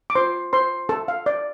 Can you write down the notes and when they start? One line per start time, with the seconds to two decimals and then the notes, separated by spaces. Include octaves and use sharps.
0.10 D6
0.15 F4 C5 C6
0.53 C5 C6
0.89 A4 A5
1.08 F5
1.26 D5